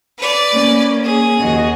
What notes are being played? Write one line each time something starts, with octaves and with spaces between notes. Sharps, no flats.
B4 D5
A#3 C#4
G#4
D#2 F#4 D#5